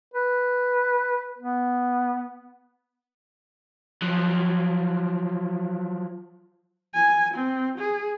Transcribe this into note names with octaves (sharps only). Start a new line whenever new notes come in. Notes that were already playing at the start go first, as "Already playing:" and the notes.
B4
B3
F3 F#3
G#5
C4
G#4